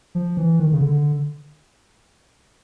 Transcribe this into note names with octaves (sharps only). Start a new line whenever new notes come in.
F3
E3
D#3
C#3
D3